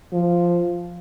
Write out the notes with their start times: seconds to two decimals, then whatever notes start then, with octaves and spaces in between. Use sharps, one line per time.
0.13 F3